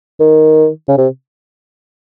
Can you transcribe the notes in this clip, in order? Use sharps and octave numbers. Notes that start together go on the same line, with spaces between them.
D#3
C#3
C3